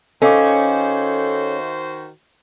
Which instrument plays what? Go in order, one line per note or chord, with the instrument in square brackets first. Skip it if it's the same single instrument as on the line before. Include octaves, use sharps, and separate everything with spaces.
[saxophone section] D#3 F#4 C5 [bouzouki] C#4 [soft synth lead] A4 [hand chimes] D#5 F5 D6